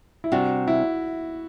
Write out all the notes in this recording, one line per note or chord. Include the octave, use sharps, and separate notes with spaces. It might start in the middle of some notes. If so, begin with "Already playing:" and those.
E4
C3 G3 D4 F#4
E4